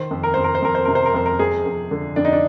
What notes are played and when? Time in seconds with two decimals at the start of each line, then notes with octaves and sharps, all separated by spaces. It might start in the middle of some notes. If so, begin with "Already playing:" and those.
Already playing: D#3 C5
0.11 F2
0.23 A#4
0.34 F2 C5
0.44 A#4
0.55 C5
0.62 F2 A#4
0.75 C5
0.85 C3 A#4
0.95 C5
1.06 A#4
1.14 F2 C5
1.26 A#4
1.39 F2 G#4
1.65 F2
1.91 D3
2.16 F2 D4
2.25 D#4
2.33 D4